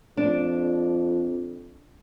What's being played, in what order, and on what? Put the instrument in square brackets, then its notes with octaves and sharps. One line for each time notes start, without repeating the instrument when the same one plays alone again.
[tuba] F2 [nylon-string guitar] D4